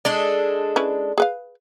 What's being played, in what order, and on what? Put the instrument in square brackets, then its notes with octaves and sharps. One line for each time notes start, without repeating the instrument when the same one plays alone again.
[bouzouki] G#3 D4 A4 [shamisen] D5
[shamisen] C#4 E4 B4
G#4 B4 F5